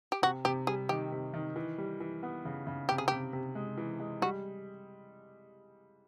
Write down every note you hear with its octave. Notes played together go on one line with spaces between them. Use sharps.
G4
C3 F#4
C3 G4
G3 G#4
D#3 G4
C3
D#3
E3
G3
E3
B3
C#3
C#3
C3 G4
G#4
C3 G4
C3
G#3
E3
G#3
G3 F#4